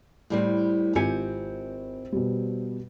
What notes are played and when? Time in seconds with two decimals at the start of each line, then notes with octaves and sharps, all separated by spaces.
0.30 A2 G3 C4
0.95 G#1 C4 F4 G4 G#5 C#7
2.12 B2 G3